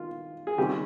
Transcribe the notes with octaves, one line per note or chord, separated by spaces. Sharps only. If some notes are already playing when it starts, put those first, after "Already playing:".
Already playing: D#3 F4
G#4
D#2 C#3 G3 C4 D#4 G4